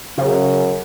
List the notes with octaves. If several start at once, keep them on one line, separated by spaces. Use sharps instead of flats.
F#2 C#3